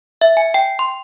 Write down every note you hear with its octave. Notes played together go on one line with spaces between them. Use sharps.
E5
G#5
G5
C6